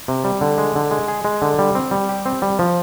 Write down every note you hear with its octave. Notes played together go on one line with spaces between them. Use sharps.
C3
G3
D3
G#3
D3
G#3
G#4
G#3
D3
G3
C4
G3
G4
C4
G3
F3